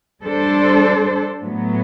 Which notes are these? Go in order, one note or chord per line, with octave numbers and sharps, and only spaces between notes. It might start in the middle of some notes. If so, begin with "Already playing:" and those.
G3 D4 A4 C5
A2 F#3 B3